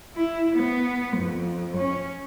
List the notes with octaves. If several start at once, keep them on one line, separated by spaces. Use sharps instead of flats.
E4
B3
F2
C#4